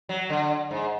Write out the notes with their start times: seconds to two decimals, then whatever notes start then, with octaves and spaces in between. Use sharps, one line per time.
0.09 F#3
0.30 D3
0.71 G#2